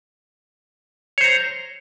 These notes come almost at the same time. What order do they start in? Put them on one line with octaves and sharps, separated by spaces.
C#5 C5 A#5